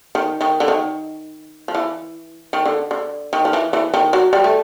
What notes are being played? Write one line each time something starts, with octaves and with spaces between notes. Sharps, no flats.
D#3
D#3
D3
D#3
F3
E3
D#3
D3
D3
D#3
F3
E3
E3
D#3
F#3
G3
A3